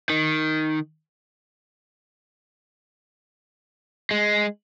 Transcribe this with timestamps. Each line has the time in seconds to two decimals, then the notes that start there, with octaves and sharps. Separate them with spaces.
0.10 D#3
4.11 G#3